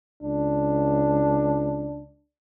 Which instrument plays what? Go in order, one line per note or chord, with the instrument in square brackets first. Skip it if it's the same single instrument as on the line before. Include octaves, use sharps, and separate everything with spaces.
[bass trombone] C#2 [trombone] D4